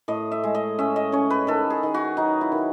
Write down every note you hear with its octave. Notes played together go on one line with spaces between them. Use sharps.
A2 D#5
E5
G#3
D#5
C#4 E5
D#5
C#4 C#5
B4
D#3 A4
G#4
D#3
F#4
F#3 D#4
E4
D#3